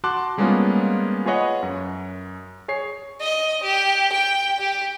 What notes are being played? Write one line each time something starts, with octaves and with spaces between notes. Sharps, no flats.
F#4 A5 C6 D6 F#6
G3 G#3 A#3 B3 C#4 F4
F4 G#4 B4 C#5 D#5 F#5
F#2
G#4 C#5 C7
D#5
G4
G5
G4